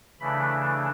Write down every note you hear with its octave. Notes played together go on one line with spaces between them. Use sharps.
C#3 E3 A3 D4 B5